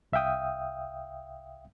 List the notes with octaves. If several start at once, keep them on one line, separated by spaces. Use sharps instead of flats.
C2 E5 F5 G5 D#6